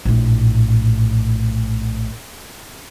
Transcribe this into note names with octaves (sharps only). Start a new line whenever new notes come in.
A#1 A2